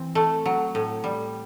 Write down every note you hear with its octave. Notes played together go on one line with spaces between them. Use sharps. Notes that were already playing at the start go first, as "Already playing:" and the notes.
Already playing: E3 C4
A3
F#3
A2
G3